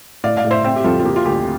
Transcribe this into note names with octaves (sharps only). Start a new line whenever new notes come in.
A2 D5 F5
D5 F5
A2
C5 E5
C4 E5 G5
G4
F2 F4 A4
F4
A#3 G4
F4
D2 G4